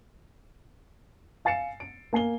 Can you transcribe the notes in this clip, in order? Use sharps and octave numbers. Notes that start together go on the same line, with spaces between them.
F5 G#5 A6 C7 C#7 E7
D7
A#3 G#5 C7 G7